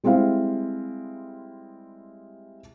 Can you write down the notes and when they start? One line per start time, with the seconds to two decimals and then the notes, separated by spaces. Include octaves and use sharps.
0.04 G3 G#3 C4 E4 F5